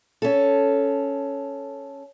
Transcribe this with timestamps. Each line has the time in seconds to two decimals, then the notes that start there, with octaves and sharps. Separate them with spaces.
0.22 C#4 A4